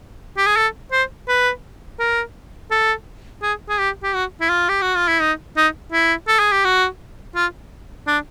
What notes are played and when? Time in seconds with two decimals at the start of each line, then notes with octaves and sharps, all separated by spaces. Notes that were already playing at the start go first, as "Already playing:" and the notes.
0.37 G4
0.46 G#4
0.56 A4
0.92 C5
1.28 B4
1.99 A#4
2.71 A4
3.42 G#4
3.69 G#4
3.78 G4
4.03 G4
4.14 F#4
4.41 E4
4.49 F4
4.69 G4
4.82 F#4
4.95 F4
5.08 E4
5.21 D#4
5.57 D#4
5.92 E4
6.28 A4
6.39 G#4
6.52 G4
6.64 F#4
7.35 F4
8.07 D4